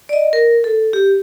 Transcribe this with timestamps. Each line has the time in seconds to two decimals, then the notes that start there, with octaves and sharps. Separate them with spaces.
0.09 D5
0.13 D#5
0.33 A#4
0.64 A4
0.93 G4